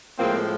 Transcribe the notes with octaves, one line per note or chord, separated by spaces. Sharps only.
A2 F3 G#3 A#3 C4